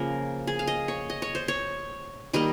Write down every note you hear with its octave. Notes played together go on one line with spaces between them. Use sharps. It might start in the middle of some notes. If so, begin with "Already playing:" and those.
Already playing: C#3 F3 A#3 A#4
G#4
F5
D#5
C#5
D#5
C#5
C5
C#5
D#3 G3 A#3 D#5